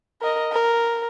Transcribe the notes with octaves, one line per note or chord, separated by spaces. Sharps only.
A#4 D#5
A#4